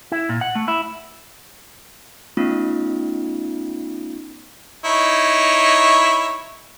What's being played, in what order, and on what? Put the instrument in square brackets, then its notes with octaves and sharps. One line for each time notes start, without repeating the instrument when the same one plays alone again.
[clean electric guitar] E4
A#2
F#5
A3
E4
[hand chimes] A3 B3 C#4 D#4 F4
[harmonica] D#4 E4 C#5